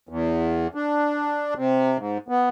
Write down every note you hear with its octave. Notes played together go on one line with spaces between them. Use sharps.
E2
D4
C3
G#2
B3